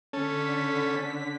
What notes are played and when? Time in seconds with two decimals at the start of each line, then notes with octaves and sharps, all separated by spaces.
0.13 D3 C#4 A4 B6